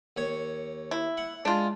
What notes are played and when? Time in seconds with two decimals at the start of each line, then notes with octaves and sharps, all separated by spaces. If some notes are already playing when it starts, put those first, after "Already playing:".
0.17 D#2 C#5
0.91 E4
1.17 F#5
1.45 G#3 D4 F4